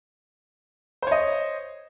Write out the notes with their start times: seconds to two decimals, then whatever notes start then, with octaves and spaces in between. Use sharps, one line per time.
1.02 C5
1.07 C#5
1.11 D#5